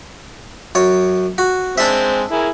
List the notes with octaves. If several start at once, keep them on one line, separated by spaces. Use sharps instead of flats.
F#2 C#5
F#4
G#3 C4 D4 E5
E4 G#4 A#4